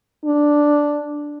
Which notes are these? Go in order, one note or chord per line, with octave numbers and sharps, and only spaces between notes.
D4